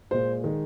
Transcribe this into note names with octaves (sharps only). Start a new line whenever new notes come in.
A#2 G#3 C5
D#3 G#3